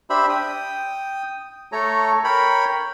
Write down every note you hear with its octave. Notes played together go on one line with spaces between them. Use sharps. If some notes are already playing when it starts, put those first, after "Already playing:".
D4 G4 C5 E5 B5
G5 D#6
A3 A4 C#5 A#5
A#4 C#5 G5 B5